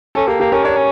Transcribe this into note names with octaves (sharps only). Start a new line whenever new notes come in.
C#4 A4
A#3 G4
A#3 G4
C#4 A#4
D4 C#5
C#4